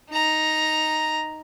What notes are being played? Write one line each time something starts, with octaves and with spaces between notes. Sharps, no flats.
D#4 A#5